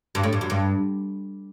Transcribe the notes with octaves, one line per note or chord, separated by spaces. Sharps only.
G2
A2
G2
F#2
G2